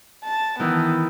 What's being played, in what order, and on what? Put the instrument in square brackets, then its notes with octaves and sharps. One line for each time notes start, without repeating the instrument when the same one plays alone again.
[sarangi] A5
[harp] D#3 E3 [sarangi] B3